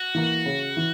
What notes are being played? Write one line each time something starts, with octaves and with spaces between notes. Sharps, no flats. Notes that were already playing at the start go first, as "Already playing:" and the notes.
Already playing: F#4
E3 A#3
C#3
E3